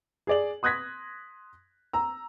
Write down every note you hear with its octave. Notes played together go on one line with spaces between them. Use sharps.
G#4 D5 F#7
C6 D#6 F#6 G#6 A#6 B6
A#5 E6